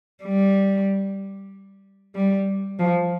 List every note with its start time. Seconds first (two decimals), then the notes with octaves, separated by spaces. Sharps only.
0.24 G3
2.15 G3
2.79 F3